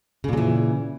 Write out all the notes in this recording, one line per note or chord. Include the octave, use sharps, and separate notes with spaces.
A#2 C#3 E3 F#3